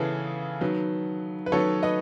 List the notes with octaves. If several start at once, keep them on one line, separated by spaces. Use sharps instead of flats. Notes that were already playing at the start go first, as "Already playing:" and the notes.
Already playing: C#3 E3 B3 G#4 A4
D#3 F#3 B3
B4
D#3 F#3 B3 A4 C#5
B4 D#5